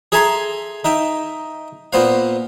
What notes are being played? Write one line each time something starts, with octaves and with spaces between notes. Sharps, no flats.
G#4 A4 E5 G#5 A#5 C6
D#4 E5 G5
A#2 B3 C5 F5